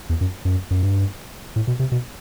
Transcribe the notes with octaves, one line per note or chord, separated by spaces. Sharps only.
E2
F#2
F#2
F#2
G2
A2
B2
C3
B2